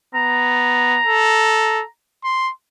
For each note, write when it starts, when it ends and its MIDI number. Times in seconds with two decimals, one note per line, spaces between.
0.15 0.99 59
0.15 1.84 82
1.06 1.83 69
2.24 2.51 84